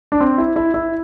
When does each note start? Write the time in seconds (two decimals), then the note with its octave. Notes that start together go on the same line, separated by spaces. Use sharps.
0.12 D4
0.20 C4
0.38 E4
0.56 E4
0.74 E4